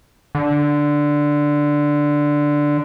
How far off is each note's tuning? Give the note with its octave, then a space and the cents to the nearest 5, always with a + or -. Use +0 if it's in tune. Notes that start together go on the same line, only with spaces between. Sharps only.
D3 +0